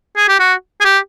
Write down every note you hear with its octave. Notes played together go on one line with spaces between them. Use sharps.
G#4
G4
F#4
G#4
G4